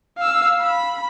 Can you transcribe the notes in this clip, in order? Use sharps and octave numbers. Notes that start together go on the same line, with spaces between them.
F5 E6
B5